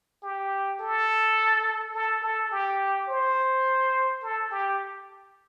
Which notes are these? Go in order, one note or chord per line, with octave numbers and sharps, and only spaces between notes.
G4
A4
A4
A4
G4
C5
A4
G4